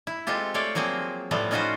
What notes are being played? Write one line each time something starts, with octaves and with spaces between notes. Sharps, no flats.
E4
G#3 C4 F4 G4 A4
A3 C#5 D5 F5 G5
F3 F#3 A#3 C4 G#4
A2 C3 F3 G3 A3 B3
C#4 D#4 F4 F#4 B4 C5